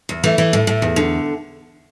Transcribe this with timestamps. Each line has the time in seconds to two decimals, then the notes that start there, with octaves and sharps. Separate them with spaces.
0.09 E2
0.24 E3 A3
0.38 E3
0.53 A2
0.67 A2
0.82 E2
0.96 D3